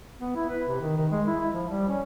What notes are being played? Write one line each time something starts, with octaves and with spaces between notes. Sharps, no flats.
B3
E4
B4
C3
D#3
D#3
G#3
E4
E4
F3
G3
C#4